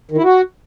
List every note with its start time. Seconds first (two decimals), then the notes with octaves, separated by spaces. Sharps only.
0.11 D#3
0.18 E4
0.24 F#4